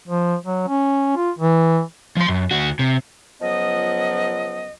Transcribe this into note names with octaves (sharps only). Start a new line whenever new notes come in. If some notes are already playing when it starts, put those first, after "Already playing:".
F3
F#3
C#4
F4
E3
F3 C6
F#2
D2 F#4
C3
C#2 F3 F#3 B3 D#5